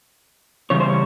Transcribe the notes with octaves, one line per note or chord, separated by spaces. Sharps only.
C#3 E3 G3 C#5
C5
C#5